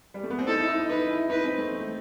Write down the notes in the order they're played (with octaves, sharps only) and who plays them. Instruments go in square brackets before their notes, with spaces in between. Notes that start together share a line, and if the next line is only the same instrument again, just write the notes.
[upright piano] G3
A3
B3
C4
[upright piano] D#4 [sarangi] A4
[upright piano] E4
D#4
[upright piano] D#4 [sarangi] B4
[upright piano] E4
[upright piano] D#4 [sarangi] B4
[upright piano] C4
A3
A3